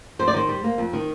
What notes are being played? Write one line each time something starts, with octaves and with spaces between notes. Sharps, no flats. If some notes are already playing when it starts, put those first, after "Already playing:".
F2 C5
D5
D#3 C5
G3
A#3
F2
D#3